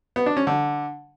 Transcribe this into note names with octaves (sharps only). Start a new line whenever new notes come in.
B3
D4
C#4
D3